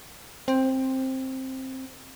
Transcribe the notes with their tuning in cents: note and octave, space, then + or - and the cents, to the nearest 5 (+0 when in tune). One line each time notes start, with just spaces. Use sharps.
C4 +10